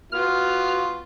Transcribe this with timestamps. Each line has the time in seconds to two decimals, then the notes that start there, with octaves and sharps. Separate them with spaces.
0.12 B3 F4 F#4 F6